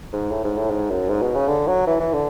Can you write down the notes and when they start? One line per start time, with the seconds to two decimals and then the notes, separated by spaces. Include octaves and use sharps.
0.13 G#2
0.31 A2
0.44 G#2
0.58 A2
0.70 G#2
0.91 F#2
1.09 G#2
1.22 B2
1.35 C#3
1.48 D3
1.68 F#3
1.87 E3
2.00 E3
2.13 D3